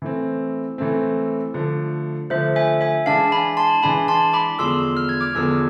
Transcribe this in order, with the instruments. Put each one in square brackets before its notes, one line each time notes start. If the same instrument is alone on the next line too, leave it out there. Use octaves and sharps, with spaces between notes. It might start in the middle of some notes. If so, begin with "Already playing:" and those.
[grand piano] E3 A3 C4
E3 A3 C4
D3 F3 A3
[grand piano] D3 F3 A3 [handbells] C5 E5
[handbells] E5 G#5
E5 G#5
[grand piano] E3 G#3 D4 [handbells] F5 A5
[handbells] G#5 B5
A5 C6
[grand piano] E3 G#3 D4 [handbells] G#5 B5
[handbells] A5 C6
B5 D6
[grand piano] E2 D3 F3 G#3 [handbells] C6 E6
[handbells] F6
G#6
D6 F6
[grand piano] E2 D3 F3 G#3 [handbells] E6 G#6